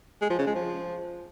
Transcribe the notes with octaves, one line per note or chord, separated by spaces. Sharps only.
G#3
F3
C#3
G#3
F3